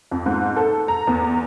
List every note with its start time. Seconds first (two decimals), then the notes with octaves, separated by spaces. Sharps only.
0.11 F2
0.26 G#2
0.56 A4
0.88 A#5
1.07 E2